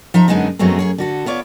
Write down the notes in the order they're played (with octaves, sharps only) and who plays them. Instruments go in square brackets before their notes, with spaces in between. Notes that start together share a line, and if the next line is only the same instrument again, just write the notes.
[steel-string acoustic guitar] F3 D#4 E5 A#5
F#2 D3 G#3 B3 D#4 D#5
F#2 F#3 G#3 A3 B3 C4
F#2 G#4 C#5
D3 F#4 A4
B3 F4 C#5 D5